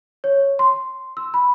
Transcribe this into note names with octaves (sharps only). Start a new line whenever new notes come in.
C#5
C6
E6
B5